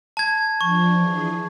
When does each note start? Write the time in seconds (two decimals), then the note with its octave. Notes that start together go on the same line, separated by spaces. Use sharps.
0.17 A5 G#6
0.61 F3 D4 C#6
0.96 E3 G#4